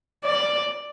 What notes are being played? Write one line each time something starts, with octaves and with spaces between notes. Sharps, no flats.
D5